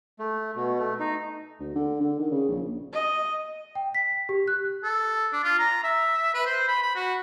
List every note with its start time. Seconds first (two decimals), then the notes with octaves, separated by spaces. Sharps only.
0.19 A3
0.56 B2
0.79 A3
1.00 D#4
1.60 D2
1.75 D3
2.00 D3
2.19 D#3
2.31 C#3
2.49 A#1
2.94 D#5
3.75 G5
3.95 B6
4.29 G4
4.48 F#6
4.84 A4
5.32 D4
5.44 F4
5.59 A#5
5.84 E5
6.34 B4
6.46 C5
6.68 B5
6.82 B5
6.96 F#4